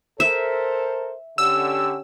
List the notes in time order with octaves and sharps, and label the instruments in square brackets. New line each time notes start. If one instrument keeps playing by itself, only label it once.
[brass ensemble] A4 A#4 C5 [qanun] E5
[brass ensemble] D3 C#4 G4 [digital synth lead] E6